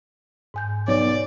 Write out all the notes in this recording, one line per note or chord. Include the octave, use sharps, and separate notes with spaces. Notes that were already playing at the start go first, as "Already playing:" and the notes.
G#2 G#5 G6
B1 C#5 D5